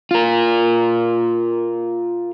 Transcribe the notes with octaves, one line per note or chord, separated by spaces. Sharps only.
F4 A#4